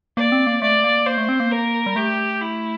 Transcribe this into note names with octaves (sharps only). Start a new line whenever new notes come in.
A#3 D5
C4
A#3
A3 D5
A#3
A#3 C5
A3
C4
A#3
A#4
G3
A3 G4
E4